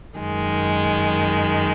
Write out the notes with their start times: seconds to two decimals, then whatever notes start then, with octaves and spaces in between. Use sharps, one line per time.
0.18 F#2 D#3 G#3